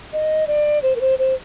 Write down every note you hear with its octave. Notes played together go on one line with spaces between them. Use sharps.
D#5
D5
C5
A#4
C5
C5